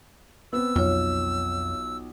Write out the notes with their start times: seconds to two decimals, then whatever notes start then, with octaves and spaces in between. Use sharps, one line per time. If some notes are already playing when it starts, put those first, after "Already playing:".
0.53 B3 C4 E6
0.76 B1 F2 F4 C#5